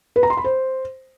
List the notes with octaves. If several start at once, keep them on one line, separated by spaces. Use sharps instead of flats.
B4
A#5
C6
B5
C5